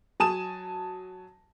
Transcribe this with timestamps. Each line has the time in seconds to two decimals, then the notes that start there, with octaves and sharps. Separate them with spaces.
0.20 F#3 G#5 A5 D#6 E7